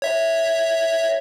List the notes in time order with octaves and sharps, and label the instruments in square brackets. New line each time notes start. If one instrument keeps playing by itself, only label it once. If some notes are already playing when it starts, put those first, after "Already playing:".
[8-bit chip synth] C#5 E5